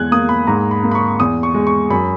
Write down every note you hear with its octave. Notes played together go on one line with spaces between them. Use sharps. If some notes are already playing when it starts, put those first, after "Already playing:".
Already playing: E2 G#3 F#6 G#6
A#3 D#6
B5
G#2 A#5
B5
A#3
B5
C#6
E2 D#6
C#6
G#3
C#6
F#2 B5